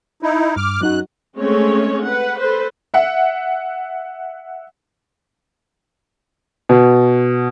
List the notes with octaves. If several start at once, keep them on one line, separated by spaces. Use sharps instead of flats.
D#4 E4
G2 D6 F6
F#2 F#3 D#4 F#4 F#6
G#3 A3 C4 C#4 C#5
B4 F#5
A4 B4 C5
E5 F#5
B2